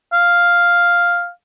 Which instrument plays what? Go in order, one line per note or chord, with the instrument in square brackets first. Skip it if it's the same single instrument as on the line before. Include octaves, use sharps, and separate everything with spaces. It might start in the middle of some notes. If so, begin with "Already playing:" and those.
[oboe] F5